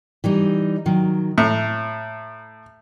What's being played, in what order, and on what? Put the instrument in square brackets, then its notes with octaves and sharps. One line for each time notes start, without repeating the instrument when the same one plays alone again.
[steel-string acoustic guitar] E3 G3 D#4
D#3 F#3
[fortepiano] A2 [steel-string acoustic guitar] A#5